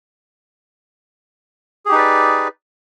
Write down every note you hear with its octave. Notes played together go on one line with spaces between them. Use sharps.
D#4 G4 G#4 B4 D5